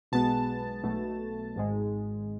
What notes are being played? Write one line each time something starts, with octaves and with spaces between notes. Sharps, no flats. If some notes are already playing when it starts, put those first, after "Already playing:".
B1 B2 G#3 B3 A5
B1 B2 A3
G#1 G#2 G#3